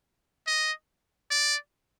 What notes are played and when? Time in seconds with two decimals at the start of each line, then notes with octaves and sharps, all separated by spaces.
0.47 D#5
1.31 D5